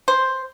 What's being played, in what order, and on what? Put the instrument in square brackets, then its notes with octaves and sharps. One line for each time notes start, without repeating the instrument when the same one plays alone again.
[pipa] C5